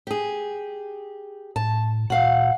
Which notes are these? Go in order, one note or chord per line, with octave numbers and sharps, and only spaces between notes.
G4 G#4
A2 A5
A#2 F#4 F5 F#5